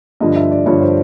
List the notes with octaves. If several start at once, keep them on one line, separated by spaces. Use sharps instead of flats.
G2 D3 F3 D#5
E5
D5
G2 D3 F3 C#5
C5